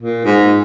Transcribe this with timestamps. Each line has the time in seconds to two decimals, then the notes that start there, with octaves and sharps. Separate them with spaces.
0.01 A#2
0.25 G#2